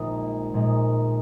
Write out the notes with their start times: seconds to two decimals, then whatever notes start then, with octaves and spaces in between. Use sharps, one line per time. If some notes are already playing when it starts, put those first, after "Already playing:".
Already playing: A#1 A#2 G#3 D#4 G#4
0.54 A#1 A#2 G#3 D#4 G#4